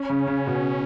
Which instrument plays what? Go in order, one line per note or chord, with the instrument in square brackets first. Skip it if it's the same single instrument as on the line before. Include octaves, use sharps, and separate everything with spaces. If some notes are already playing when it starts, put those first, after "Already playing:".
Already playing: [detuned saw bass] C#4
[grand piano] C#3
C#3
B2